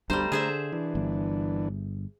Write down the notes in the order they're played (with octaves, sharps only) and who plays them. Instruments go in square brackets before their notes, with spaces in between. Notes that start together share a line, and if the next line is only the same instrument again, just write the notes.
[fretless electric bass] G1 D2 G2 [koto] G3 C5 [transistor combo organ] A3 A#5
[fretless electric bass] D3 [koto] G#4 C5 E5
[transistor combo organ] E3 D4
[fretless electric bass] G1